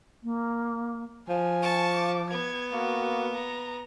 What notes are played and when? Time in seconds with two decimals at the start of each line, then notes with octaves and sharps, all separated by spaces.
0.23 A#3
1.29 F3 G#5
1.62 A5 C#6
1.94 D6
2.31 B3 G#6
2.73 A#3 F#4
3.35 A#5